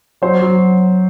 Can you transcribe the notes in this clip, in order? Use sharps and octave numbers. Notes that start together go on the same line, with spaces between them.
F#3 C5
F#3